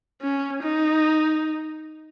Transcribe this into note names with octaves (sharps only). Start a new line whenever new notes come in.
C#4
D#4